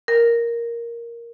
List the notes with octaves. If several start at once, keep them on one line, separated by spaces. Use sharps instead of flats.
A#4